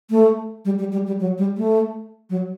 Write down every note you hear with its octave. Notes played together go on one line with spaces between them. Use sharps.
A3
G3
G3
G3
G3
F#3
G3
A3
F#3